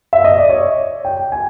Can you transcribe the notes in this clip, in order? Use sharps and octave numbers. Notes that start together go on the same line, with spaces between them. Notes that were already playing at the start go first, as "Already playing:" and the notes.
E5
D#5
D5
C#5
G5
G#5